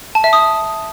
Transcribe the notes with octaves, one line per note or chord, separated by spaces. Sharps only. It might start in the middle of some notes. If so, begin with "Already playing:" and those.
A5
E5
D#6